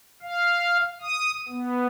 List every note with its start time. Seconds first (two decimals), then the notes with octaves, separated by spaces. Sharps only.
0.22 F5
1.02 D#6
1.48 B3